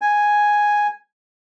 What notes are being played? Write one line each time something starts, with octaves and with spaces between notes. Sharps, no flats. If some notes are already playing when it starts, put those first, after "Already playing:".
G#5